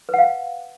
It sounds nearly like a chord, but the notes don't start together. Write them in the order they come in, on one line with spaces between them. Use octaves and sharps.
B4 F#5 F5